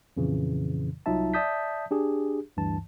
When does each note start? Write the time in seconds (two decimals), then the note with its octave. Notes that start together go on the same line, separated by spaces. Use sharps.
0.17 F2 A#2 C#3 E3
1.06 C2 F#3 D#4 F4 E5 A5
1.34 D5 E5 A5 D#6 G6 B6
1.91 D4 G4 G#4
2.57 D2 G2 E3 A5